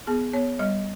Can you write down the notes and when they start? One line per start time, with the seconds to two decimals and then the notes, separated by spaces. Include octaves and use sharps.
0.07 B3 G#4
0.33 B3 C#5
0.59 G3 D#5